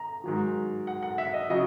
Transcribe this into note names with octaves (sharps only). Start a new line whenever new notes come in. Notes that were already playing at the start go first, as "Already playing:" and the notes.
Already playing: A#5
G#2 D#3 F#3
F#5
F#5
E5
D#5
C#3 F#3 D#5